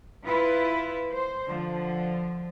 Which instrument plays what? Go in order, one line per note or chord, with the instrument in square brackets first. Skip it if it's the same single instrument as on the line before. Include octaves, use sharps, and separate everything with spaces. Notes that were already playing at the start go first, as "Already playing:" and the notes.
[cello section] E4 F4 B4
C5
D3 F3